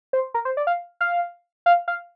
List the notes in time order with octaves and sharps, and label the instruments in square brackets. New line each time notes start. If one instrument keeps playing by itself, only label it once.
[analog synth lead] C5
A#4
C5
D5
F5
F5
F5
F5